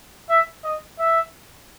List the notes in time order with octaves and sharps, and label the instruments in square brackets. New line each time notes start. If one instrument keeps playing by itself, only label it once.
[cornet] E5
D#5
E5